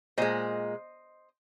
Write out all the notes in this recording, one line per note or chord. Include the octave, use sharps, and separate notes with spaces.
A#2 G#3 C5 D#5